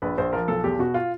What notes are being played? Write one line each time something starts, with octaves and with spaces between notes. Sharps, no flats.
A#1 B4
A#1 C5
F3 A#4
B1 A4
E2 G4
B2 F#4
F4